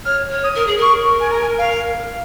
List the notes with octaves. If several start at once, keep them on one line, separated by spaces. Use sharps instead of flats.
C#5 F6
C#5
D#6
A#4
G#4
A#4 C#6
G#5
A#5
G#5
F5